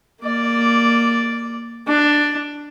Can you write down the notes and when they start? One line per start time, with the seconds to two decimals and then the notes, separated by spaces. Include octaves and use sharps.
0.22 A#3 D5
1.87 D4